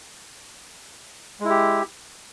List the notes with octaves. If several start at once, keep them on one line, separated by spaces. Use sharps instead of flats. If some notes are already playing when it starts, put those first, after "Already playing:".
G#3 E4 G4